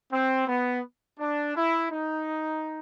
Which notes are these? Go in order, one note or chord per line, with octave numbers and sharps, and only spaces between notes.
C4
B3
D4
E4
D#4